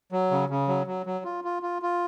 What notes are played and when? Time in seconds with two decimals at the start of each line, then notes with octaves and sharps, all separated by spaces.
0.12 F#3
0.31 C#3
0.49 C#3
0.68 F#3
0.87 F#3
1.06 F#3
1.25 F4
1.44 F4
1.63 F4
1.82 F4